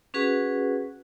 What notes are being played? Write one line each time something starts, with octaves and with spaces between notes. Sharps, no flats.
C#4 F#4 G#4 B4 F#5